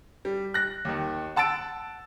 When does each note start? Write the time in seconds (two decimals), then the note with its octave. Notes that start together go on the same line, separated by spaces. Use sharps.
0.25 G3
0.54 F#6 A#6
0.85 D#2 D#3
1.36 F#5 A5 E6 A6 D7